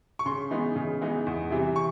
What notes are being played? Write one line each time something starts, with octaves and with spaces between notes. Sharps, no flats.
C#6
C#3 C6
E3 G#3 B3 D#4
C#3
E3 G#3 B3 D#4
E2
C3 E3 G3
C#6